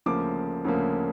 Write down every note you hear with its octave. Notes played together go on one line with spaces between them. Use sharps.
D2 C#3 F3 A#3 D6
D2 C#3 F3 A#3